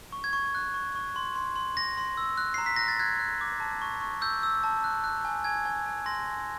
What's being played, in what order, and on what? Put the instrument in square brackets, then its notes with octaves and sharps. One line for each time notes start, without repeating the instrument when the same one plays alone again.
[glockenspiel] C#6
G#6
C#6
F#6
C#6
C#6
C6
C6
C6
C6 A#6
C6
E6
F#6
A#5 C7
B6
F#6 A#6
A6
F#6 G#6
F#6
D6
A5
C#6
C#6
E6 G6
E6
A5
F#6
F#6
G#5
G#5 G#6
G#5
G#5
C6 A#6
G#5